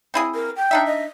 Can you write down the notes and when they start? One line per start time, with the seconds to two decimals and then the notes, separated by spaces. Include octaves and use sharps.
0.14 C4 E4 G#4
0.35 A#4
0.57 G5
0.71 D4 D#4 E5
0.86 D#5